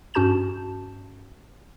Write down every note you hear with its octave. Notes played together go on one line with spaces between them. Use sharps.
G2 C#4 F#4 A5 G6 E7